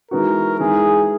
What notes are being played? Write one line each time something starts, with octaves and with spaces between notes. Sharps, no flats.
E3 G#3 B3 D#4 F#4 A#4
E3 G#3 D#4 G#4